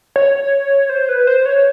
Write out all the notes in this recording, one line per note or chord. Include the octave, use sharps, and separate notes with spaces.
C#5
C5
B4
C5
C#5